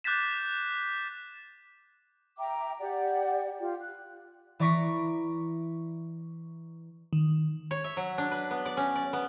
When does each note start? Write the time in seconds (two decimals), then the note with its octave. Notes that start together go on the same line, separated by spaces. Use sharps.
0.04 D6 F#6 G6 A6 B6 E7
2.38 E5 G5 A#5 D6
2.80 G4 D5 F#5
3.60 F4 G4
3.80 F#6
4.59 E3 D5 A#5 C#6 B6 D7
7.13 D#3
7.71 C#5
7.84 E5
7.97 F#3
8.18 D4
8.31 B4
8.51 B3
8.66 D5
8.77 C#4
8.95 D5
9.13 B3